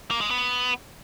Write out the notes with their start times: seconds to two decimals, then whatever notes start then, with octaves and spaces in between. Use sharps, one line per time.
0.11 A#3
0.21 G#3
0.30 B3